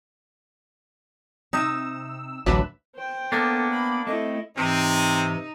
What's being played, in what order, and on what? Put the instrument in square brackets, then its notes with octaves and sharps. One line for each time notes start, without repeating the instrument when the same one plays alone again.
[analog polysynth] C3 E6 [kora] D#4
[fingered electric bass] A1 D2 [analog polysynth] F#3 D4 [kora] B4 E5
[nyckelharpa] C5 G5
[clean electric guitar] A#3 D4 [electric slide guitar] B3 [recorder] A4
[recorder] B5
[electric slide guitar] A3 C4 [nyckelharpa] E4 A4 [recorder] D#5
[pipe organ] G#2 E3 [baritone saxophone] C3 [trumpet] C4 [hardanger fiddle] D#4